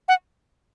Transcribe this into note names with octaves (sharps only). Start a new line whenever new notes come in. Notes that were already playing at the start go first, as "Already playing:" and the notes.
F#5